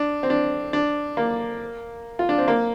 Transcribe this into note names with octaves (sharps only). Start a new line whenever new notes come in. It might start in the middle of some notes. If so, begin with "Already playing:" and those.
Already playing: D4
C4
D4
D4
A#3
F4
D4
C4
A#3